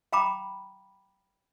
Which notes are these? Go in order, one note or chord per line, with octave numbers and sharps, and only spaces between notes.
F5 G5 A#5 B5 D6